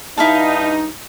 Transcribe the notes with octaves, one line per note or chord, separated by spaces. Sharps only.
G2 D#4 E4 F5 A5